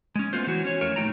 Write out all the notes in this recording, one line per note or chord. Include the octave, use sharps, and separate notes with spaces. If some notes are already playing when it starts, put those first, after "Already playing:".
G#3 C#4
A3 B3 F4 C5
E3 F#3 F#4
C#4 C#5
F2 A3 A#4 C#5
A#2 D#3 A3 E4 G5 A#5